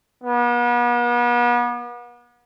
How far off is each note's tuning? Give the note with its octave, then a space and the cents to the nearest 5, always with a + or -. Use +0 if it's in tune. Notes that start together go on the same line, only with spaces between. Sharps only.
B3 -40